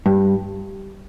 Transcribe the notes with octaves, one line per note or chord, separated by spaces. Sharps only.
G2